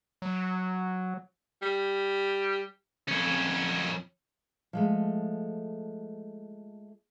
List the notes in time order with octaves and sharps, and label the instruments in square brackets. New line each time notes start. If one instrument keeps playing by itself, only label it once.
[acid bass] F#3
[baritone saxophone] G3
[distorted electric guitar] F2 C#4
[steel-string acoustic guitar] F3 G#3 A3